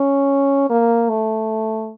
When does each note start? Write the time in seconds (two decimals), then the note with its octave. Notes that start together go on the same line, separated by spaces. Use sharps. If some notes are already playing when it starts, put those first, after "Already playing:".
Already playing: C#4
0.69 A#3
1.09 A3